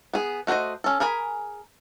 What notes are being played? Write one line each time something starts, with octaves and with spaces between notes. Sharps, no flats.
B3 G#4
A3 F#4 B4 C5 D#5
C#4 A4
G#4 A#4 G#5 B5